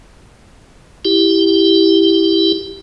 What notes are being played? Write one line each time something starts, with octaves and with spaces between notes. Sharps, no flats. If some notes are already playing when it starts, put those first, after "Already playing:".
E4 G4